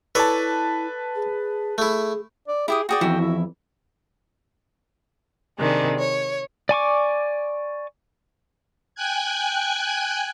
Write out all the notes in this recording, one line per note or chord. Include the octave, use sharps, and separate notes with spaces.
E4 A4 B4 C#5 D5 A5
G#4
A3 E4 G#4
D5
E4 G4 G#4 D#6
F#4 G#4 D5 G5
F2 E3 F#4 E5
E4
C3 D#3 G#3 D4
C#5
D5 G#5 C#6 D6
G5 G#5 F#6 G#6